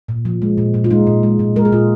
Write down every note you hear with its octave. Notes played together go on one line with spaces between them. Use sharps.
A#2
F3
G#3
A#2
A#2
F4
G#3 D#4
A#2
G#3
A#2
G#3 A#4
G#4
A#2 F4